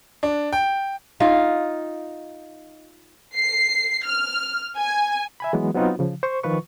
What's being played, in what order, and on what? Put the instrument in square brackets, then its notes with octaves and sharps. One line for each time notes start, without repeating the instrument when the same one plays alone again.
[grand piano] D4
G5
[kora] D#4 F4 F5
[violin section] C7
F6
G#5
[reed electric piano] E5 G#5 B5
E3 F#3 G#3 B3
F#3 B3 C4 D#4 F4 F#4
C#3 F3
C5 C#6
D#3 F3 F4 B4 C#6